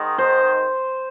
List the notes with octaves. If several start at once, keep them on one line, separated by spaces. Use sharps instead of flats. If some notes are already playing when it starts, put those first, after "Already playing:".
Already playing: G#2 D#3 G#3
C5